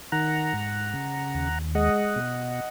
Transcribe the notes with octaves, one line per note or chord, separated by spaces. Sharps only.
D#3 F#5 A#5
G#2
C#3
D#2
G#3 D#5 F#5
B2